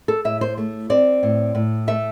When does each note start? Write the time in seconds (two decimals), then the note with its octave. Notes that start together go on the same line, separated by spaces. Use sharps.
0.08 A4
0.25 A2 E5
0.41 C5
0.58 A3
0.90 C4 D5
1.23 A2
1.55 A2
1.87 A3 E5